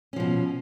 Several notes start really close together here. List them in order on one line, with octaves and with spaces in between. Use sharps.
C#4 F3 B2